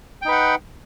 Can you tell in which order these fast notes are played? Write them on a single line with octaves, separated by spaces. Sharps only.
G5 D#4 B4 F#5